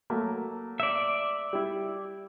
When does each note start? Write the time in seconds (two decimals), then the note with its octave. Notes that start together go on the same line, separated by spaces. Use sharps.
0.10 F#3 A3 A#3
0.80 D5 E5
1.53 G3 E4